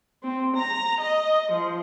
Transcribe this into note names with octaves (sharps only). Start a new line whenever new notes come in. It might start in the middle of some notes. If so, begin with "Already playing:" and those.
C4
A#5
D#5
F3